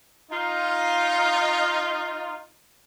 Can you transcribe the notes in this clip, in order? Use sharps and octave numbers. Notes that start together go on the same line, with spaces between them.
D#4 F4